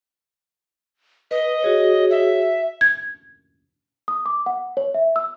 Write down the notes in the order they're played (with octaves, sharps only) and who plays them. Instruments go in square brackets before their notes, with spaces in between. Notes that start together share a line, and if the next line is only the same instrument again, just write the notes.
[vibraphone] B4 [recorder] D#5
[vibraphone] F#4 G#4 C#5
[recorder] E5
[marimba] G#6
[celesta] D#6
D6
F#5
C#5
E5
E6